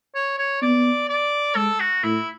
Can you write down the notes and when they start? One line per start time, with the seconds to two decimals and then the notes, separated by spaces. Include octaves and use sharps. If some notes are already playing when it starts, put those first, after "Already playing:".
0.15 C#5
0.39 C#5
0.62 B3 D5
1.09 D5
1.56 G#3 A4
1.80 F#4
2.04 A2 E4